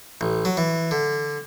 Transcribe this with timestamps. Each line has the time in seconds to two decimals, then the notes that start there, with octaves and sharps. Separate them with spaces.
0.21 A1
0.45 F#3
0.57 E3
0.91 D3